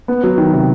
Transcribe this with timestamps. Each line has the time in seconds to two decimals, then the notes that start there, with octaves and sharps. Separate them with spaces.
0.08 B3
0.24 F#3
0.38 D#3
0.53 C3